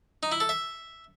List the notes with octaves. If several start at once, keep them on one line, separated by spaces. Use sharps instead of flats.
D#4
E4
A4
E5